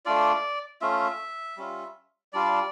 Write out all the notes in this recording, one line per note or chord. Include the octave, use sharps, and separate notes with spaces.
A3 D4 F4 D5
A3 C#4 F4 E5
G3 C#4 F4
G3 D4 F4 D5